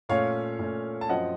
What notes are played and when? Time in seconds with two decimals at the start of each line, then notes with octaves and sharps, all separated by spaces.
0.09 A#2 A3 C#4 C#5 F5
0.59 A#2 A3 C#4
1.01 A5
1.09 F#2 F3 C4 D#5 F#5